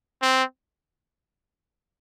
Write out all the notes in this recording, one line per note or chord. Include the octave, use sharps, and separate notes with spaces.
C4